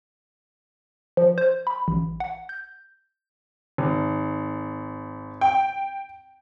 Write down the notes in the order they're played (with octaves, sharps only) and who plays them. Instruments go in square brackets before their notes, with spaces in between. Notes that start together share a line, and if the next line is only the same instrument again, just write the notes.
[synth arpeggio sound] F3
C5
B5
A1
F#5
G6
[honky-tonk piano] G#1
G5